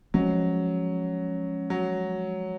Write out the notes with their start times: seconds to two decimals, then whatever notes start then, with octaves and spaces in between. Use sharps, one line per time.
0.14 F3 F#3 G#3 C#4
1.70 F#3